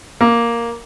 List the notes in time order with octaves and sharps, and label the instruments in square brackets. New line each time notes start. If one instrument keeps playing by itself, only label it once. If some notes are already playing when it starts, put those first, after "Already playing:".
[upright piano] A#3